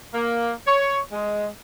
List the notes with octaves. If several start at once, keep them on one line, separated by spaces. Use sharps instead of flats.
A#3
C#5
G#3